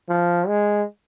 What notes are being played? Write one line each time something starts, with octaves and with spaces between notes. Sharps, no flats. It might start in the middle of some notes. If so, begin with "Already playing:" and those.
F3
G#3